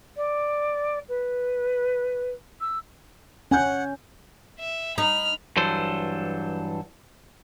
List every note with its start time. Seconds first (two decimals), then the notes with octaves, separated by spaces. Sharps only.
0.17 D5
1.09 B4
2.61 E6
3.51 C#4 F#5 G#5 G6
4.59 E5
4.98 D#4 B5 F6
5.57 G2 E3 F#3 A4 C5